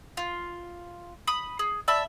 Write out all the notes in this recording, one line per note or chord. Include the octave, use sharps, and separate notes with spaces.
F4
B5 D#6
G#4
D5 E5 A5 B5